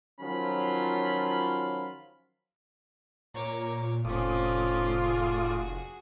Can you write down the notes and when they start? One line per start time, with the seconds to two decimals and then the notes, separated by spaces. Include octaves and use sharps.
0.21 D#3 F3 F#3 C#4 F4 B5
3.34 A#2 A#3 C#5 D6
4.05 F1 A2 C4 C#4 F4 D5 D#6
5.02 F#4 G#4